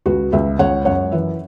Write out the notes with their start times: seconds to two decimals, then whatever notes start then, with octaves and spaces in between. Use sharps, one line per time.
0.06 C#2 F#4 B4
0.32 C#2 B4 E5
0.59 C#2 C#5 F#5
0.85 F#2 C#5 F#5
1.12 E3 B4 E5